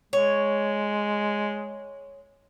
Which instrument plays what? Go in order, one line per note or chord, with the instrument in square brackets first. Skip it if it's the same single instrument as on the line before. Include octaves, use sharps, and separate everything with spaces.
[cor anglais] G#3 [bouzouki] C#5